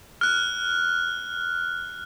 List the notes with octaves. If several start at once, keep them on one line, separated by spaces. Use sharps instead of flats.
F6 F#6